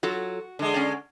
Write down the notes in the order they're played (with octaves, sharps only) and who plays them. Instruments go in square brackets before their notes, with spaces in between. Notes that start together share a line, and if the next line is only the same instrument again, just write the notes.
[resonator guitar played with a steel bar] F#3 F4 A4 [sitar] F#4
[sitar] D3 G#3 [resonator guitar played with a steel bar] D4
[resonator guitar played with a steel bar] C#4 C#5 D5